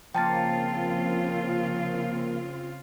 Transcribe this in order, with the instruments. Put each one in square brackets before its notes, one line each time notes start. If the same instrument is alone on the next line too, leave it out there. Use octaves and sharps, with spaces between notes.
[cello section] C#3 C4 F4 [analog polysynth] F3 A#3 [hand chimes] G5 A5 A6